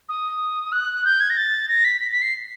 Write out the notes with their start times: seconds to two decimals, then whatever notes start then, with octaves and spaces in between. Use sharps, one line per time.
0.09 D#6
0.72 F#6
1.05 G6
1.20 G#6
1.30 A#6
1.37 A6
1.69 A#6
1.85 B6
2.00 B6
2.11 B6
2.22 C7